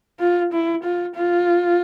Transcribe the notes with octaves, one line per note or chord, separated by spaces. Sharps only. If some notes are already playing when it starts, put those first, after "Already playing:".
F4
E4
F4
F4